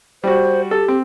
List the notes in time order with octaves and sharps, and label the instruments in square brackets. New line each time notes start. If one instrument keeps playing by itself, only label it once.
[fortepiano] G3 F#4 [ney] C5
[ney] G4 [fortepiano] A4
[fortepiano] C4